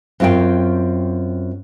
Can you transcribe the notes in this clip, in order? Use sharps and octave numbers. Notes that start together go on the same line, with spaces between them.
F#2 C4 F4 C#5 G5